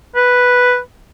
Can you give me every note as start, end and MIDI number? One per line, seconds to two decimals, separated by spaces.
0.15 0.79 71